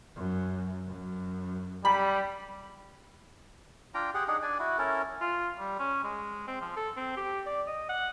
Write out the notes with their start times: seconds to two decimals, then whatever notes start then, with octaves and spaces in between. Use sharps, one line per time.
0.16 F#2
0.87 F#2
1.85 G3 B5
3.94 D4 F4 G5 A#5
4.14 G4 G#4 F#5
4.28 D4 D#4 G#4 F#5
4.42 D4 D5 G#5
4.59 E4 F#4
4.78 C#4 E4 A4 A#4
5.21 F4
5.59 G3
5.79 C#4
6.04 G#3
6.48 C4
6.61 F3
6.76 A4
6.97 C4
7.17 G4
7.46 D5
7.68 D#5
7.89 F#5